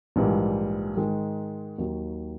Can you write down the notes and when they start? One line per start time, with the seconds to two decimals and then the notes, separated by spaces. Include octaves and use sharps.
0.16 A#1 G#2 E3 G3 A#3
0.97 G#2 D#3 G#3
1.78 D#2 D#3 F#3